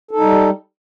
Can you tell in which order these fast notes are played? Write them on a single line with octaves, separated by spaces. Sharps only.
A4 D#4 G3